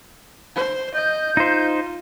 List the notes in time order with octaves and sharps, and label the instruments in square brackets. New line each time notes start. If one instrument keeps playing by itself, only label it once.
[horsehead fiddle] C5
[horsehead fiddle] D#5 [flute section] G6
[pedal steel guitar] D#4 C5 [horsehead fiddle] F4